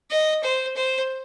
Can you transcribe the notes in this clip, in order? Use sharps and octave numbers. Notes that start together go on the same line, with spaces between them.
D#5
C5
C5